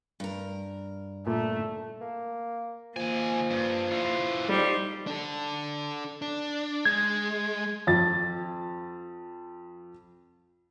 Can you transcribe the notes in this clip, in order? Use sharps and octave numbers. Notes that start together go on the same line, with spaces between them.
G2 A#4
A#2 A3
A#3
D#3 F3 A#3 G#5
G2
E3 F4
F2 G3 D#4 C5
D4 A4
D4
G#3 G#6
F2 A6